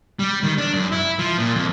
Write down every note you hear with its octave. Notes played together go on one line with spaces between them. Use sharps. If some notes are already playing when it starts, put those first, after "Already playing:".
G3
D#3
D4
F#2
E4
F3
A#2
F2